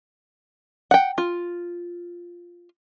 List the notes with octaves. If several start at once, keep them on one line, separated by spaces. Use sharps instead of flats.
F#5 G5
F4